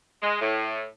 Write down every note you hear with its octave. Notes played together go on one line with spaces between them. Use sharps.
G#3
A2